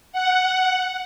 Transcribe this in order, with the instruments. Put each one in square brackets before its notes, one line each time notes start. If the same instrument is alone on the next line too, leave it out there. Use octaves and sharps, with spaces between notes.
[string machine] F#5